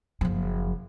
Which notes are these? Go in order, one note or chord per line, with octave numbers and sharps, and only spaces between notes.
F#1 F3